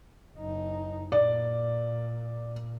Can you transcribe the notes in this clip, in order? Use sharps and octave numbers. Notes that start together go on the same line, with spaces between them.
F#1 D#4
A#2 D5